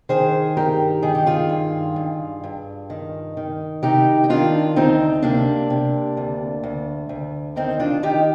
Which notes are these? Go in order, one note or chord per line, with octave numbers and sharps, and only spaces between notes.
D#3 G#4 C5
G2 G4 A#4
D#3 G#4
G4
F4 G#4
G2
G2
G2
D#3
D#3
C3 D#4 G4
D#4
D#3 D4 F4
D2 C4 D#4
C3 A#3 D4
C3
D2
D2
D2
D#3 C4 D#4
D4 F4
D#3 D#4 G4